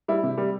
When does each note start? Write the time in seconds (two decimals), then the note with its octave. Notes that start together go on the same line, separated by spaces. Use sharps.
0.08 G3 E4
0.23 C3
0.38 G3